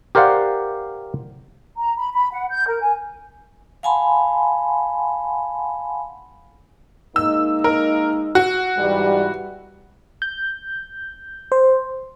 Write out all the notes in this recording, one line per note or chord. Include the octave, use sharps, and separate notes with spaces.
G4 A#4 C5 D5 F5 F#5
A#5
B5
B5
F#5
G6
A#4
G#5
F5 F#5 G#5 A5 B5 C6
G#3 A#3 D#4 E6
A#4
F#4
G#2 E3 G3
G6
C5